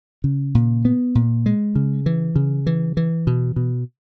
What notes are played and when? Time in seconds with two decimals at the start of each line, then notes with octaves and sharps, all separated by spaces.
0.24 C#3
0.55 A#2
0.85 B3
1.15 A#2
1.46 G#3
1.75 C#3
2.06 E3
2.36 C#3
2.66 E3
2.97 E3
3.27 B2
3.56 B2